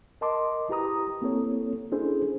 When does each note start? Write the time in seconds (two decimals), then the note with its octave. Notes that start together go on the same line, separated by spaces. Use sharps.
0.21 A#4 D#5 A5 C6 D6
0.69 E4 G4 B4 A#5 D#6
1.22 A#3 C4 E4 A4 C#5
1.92 C#4 D4 E4 G#4 A4 C5